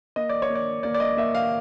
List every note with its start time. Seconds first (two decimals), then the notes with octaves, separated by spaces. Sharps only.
0.16 A#3 D#5
0.29 D5
0.42 C#5
0.50 A#3
0.55 D5
0.83 A#3 D5
0.94 D5
1.00 D#5
1.17 A#3 E5
1.35 F5